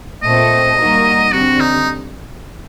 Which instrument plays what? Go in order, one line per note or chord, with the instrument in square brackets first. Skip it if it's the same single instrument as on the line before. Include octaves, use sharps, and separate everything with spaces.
[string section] A#2 A3 C4 [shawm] D#5
[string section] G3 A#3 D#4 F#4 A#4
[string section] D3 G3 C4 [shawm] F#4
[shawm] D#4